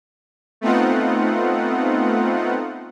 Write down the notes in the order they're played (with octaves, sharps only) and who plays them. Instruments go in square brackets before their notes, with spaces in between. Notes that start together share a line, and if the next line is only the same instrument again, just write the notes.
[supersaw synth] A3 B3 C4 D#4 F4 F#5